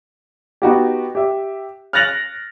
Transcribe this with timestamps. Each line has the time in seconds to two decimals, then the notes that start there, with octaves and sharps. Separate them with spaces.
0.62 B3 D#4 F#4 G4
1.15 G4 E5
1.93 F6 F#6 A6 A#6 F7 F#7